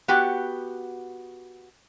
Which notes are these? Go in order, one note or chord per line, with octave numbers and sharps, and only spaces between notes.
B3 F#4 G4